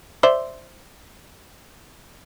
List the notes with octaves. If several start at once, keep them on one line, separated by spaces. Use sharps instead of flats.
C5 D5 E5